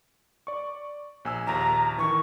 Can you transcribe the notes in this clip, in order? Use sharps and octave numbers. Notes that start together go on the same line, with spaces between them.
D5 C#6
A#1 G#5 E6
A#1 D#2 A#5
D#3 E3 C#6